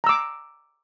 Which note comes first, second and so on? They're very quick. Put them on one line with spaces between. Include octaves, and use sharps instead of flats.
A#5 E6 D6